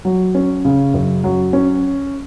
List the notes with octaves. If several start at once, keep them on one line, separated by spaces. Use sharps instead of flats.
F#3
C#4
C#3
F#2
F#3
C#4